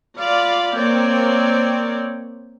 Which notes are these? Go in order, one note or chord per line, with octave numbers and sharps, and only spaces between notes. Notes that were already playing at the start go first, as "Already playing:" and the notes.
F4 D5 F5 B5
A#3 C4 A#4 C#5 D5 G5